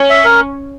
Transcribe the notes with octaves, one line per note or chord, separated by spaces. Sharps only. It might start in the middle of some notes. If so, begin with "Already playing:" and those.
Already playing: C#4
E5
A#4